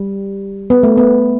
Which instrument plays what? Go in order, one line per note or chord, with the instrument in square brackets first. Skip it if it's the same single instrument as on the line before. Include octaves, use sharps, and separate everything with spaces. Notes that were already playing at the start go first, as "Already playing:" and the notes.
Already playing: [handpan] G3
B3
A3
B3